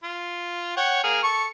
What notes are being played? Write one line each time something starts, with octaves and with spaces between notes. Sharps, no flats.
F4
C#5 F#5 G5
A#3 G#4 F6
A4 C#6